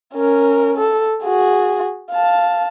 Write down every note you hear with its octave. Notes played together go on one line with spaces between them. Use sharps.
C#4 A#4
A4
F#4 G#4
F5 A5